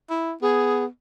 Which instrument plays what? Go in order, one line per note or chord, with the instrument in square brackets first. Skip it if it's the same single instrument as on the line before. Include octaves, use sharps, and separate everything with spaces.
[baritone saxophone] E4
[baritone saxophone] B3 [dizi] G#4